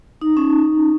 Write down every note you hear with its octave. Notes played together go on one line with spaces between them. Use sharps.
D#4
C#4